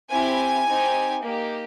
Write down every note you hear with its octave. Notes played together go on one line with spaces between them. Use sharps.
C4 E4 G4 G#5
C4 D#4 G4
A#3 D#4 G4